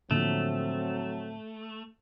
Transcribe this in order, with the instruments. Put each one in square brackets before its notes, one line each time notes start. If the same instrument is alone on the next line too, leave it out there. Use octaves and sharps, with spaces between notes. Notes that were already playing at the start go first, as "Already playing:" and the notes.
[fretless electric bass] A2 A#3 [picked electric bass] D3 F3 [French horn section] F#3 C4 [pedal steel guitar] A3